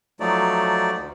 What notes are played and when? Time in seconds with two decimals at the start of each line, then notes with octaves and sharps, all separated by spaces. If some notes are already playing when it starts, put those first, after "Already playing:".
0.20 F3 F#3 A3 D#4 D5
0.99 D2